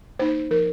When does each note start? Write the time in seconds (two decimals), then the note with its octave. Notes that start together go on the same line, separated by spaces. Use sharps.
0.19 A#3 D#4 C5
0.51 F3 A#4